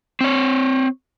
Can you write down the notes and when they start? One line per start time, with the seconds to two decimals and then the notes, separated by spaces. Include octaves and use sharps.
0.21 C4 C#5